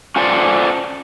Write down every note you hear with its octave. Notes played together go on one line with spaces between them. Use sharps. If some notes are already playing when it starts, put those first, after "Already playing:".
C#4 F4 A4 C5 D5